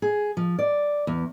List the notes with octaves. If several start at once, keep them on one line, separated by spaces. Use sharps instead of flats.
G#4
F3
D5
E2